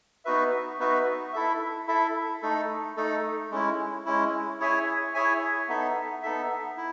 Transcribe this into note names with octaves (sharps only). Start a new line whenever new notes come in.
B3 D#4 F#4 B4 E5
B3 D#4 F#4 B4 E5
E4 A4 E5
E4 A4 E5
A3 D#4 A4
A3 D#4 A4
G#3 C#4 E4
G#3 C#4 E4
E4 G#4 C#5 E5 G#5
E4 G#4 C#5 E5 G#5
B3 D#4 A4 E5
B3 D#4 A4 E5
E4